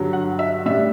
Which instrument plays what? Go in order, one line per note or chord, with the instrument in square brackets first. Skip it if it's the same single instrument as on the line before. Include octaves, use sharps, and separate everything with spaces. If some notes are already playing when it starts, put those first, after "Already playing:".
Already playing: [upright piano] G2 D3 F#3
F#5
E5
A2 G3 D4 E5